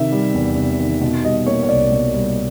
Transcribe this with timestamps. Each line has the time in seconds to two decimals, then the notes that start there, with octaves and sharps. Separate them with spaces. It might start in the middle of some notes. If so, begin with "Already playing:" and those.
Already playing: C3 D#3 E5
0.12 G3
0.34 E2
0.56 C3
0.79 D#3
1.01 B2
1.23 G3 D#5
1.46 A#3 C#5
1.63 C#5
1.69 C2 D5
1.92 B2
2.13 G3